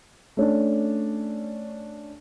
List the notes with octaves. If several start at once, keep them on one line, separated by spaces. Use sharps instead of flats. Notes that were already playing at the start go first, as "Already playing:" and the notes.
A3 C#4 D4